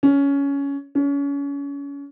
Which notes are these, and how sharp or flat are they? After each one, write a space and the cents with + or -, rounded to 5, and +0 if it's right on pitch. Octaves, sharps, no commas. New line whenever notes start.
C#4 +15
C#4 +30